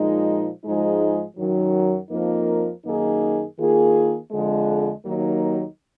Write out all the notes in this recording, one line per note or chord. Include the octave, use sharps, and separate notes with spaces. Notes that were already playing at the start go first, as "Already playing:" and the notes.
Already playing: A#2 F3 G#3 D#4
G#2 F3 G#3 D#4 G#4
F#2 D#3 F#3
F2 F3 A#3 D#4 A#4
F#2 D#3 A#3 D#4 G#4
D#3 A#3 F4 G#4
F2 D3 F3 G#3
D#2 D#3 F#3 A#3 D#4